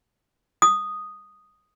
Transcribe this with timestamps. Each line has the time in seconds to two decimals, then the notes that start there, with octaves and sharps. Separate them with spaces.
0.62 D#6